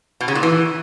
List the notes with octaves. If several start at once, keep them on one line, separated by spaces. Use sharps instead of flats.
B2
C#3
A#2
E3